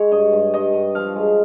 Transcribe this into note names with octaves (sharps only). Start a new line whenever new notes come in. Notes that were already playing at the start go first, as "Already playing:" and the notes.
Already playing: G#3 C#5
G2 D#5
G2
G2 D#5
G2
F3 F5
G#3